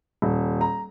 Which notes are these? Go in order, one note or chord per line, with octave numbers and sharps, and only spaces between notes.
D#1
A#5